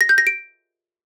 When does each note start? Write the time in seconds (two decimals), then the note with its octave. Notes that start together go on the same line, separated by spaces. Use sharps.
0.01 A#6
0.09 G6
0.18 A#6
0.27 D7